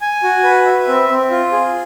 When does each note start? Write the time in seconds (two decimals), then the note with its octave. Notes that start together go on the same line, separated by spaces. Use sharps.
0.01 G#5
0.23 F#4
0.44 B4
0.65 E5
0.88 C4
1.09 C4
1.31 F4
1.52 G#4